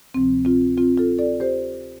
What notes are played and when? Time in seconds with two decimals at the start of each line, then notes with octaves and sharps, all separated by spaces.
0.14 D2 C3 F3 C4
0.45 C4 F4
0.78 C4 F4
0.98 F4 A4
1.19 A4 D5
1.40 G4 C5